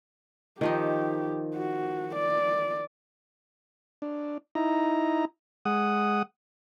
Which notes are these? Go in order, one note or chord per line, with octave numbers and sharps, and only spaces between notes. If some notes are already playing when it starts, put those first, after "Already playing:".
D#3 F3 D#4 G4
F#4
D5
D4
D#4 E4 A#5
G#3 F#5 D#6